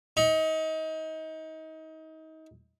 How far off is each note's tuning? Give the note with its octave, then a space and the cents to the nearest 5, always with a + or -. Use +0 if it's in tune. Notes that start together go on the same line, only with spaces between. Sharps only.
D#4 +30